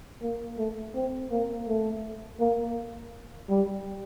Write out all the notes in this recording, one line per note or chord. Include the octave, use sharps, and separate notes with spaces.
A#3
A3
C4
A#3
A3
A#3
G3